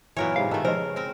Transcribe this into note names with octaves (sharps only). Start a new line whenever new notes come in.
A#2 E3 F#3 B3 A#4 C#5
G#2 C3 B4 F5
B2 D#3 A3 A4
C#3 F3 G#3 A#4
C4 A#4